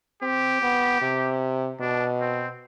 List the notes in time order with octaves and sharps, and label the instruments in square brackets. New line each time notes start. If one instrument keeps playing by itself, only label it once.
[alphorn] C4 [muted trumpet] G4
[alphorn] B3
C3
[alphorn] B2 [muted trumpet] D4
[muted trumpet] C4